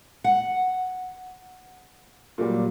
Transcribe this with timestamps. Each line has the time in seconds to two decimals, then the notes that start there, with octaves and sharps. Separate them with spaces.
0.24 F#5
2.38 A#2 F#3 G3